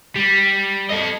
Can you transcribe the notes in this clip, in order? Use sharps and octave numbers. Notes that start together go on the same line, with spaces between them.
G3
A4 D#5